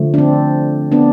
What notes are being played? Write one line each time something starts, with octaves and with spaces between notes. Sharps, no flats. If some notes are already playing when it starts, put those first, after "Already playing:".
Already playing: D3 F3 A3
D4
C4
B3 D4